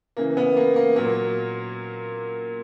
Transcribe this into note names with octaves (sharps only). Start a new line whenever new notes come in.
C#3 E3 A#3
B3
A#3
A#3
A#2 F#3 A#3